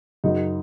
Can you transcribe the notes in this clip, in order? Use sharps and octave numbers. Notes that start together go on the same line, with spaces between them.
F#2 C#3 F#3 D#4